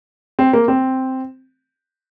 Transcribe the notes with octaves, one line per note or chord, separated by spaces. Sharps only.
C4
A#3
C4